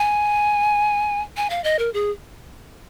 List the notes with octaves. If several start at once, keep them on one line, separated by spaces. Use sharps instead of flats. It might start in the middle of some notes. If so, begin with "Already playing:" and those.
Already playing: G#5
G#5
F5
D#5
A#4
G#4